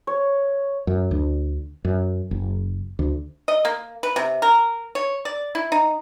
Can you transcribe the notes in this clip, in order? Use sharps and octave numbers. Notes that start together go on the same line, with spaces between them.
C#5
F#2
D2
F#2
F#1
D2
D#5
A#3
B4
C3
A#4
C#5
D5
E4
D#4